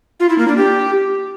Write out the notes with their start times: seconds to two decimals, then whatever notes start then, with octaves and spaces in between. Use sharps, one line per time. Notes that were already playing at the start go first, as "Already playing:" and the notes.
0.20 F4
0.29 E4
0.39 A#3
0.48 D4
0.57 G4